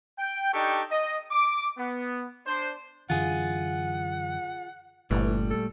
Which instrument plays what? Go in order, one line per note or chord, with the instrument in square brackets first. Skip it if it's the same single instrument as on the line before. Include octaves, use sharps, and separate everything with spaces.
[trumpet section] G5
D4 D#4 G4 A4 G5 C#6
D#5
D6
B3
D4 C5
[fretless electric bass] F#2 D3 E3 [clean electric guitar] F4 G#4 [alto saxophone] F#5
[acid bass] G1 [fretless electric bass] A#2 [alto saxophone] E3 [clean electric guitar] G3 A3
[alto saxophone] A4